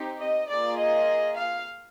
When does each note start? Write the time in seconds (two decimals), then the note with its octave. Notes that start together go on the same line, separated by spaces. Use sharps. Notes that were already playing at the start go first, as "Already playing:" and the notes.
Already playing: C4 D#4 G4
0.21 D#5
0.50 A#3 F4 G#4 D5
0.79 D#5
1.37 F5